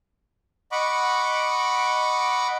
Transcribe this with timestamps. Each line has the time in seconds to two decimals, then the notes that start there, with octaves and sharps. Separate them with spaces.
0.72 D#5 F#5 B5 C#6 D6